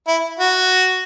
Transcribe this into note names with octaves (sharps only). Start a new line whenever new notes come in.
E4
F#4